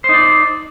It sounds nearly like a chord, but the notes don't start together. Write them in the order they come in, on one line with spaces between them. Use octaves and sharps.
C5 D#4 D5